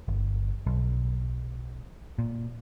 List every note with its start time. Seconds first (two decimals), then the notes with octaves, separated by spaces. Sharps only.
0.08 G1
0.67 B1
2.19 A#2